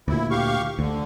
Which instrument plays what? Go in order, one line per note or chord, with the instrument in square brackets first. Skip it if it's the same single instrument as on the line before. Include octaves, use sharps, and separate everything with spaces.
[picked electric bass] D2 A#2 [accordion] E4
[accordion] G4 F5 C#6
[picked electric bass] D2 [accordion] D3